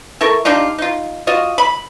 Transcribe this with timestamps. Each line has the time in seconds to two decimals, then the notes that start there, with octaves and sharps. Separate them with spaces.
0.21 E4 A4 A#4 C#6
0.45 G3 D4 D#4 F4
0.78 D#4 F4
1.27 F4 F#4 D#5
1.58 B5